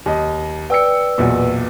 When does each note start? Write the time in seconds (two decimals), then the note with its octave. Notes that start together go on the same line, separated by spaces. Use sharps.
0.06 D#2 D#5
0.70 B4 D5 G5 E6 C#7
1.18 B1 E2 A#2